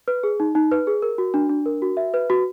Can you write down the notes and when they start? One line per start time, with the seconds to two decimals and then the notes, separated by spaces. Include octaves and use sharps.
0.08 B4
0.23 G#4
0.40 D#4
0.55 D#4
0.71 B4
0.87 G#4
1.02 A#4
1.18 F#4
1.34 D4
1.49 D4
1.66 A#4
1.82 F#4
1.97 E5
2.14 B4
2.30 F#4